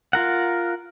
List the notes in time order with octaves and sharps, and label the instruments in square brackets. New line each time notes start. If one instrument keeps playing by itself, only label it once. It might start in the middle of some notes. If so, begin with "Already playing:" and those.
[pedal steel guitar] F4 A#4 F#5